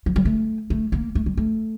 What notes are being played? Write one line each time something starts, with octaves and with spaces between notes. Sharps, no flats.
F3
G3
A3
A3
A#3
A3
G3
A3